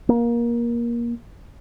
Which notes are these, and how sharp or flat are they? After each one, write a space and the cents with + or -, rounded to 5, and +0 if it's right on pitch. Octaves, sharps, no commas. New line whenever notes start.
A#3 +20